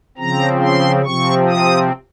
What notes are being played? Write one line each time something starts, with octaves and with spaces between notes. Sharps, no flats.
C#3 F3 C4 A#5
C6
C3 F3 C4 C#6
D#6